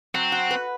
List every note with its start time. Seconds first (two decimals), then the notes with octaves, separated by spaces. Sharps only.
0.14 F#3 C4
0.32 F#4
0.51 B4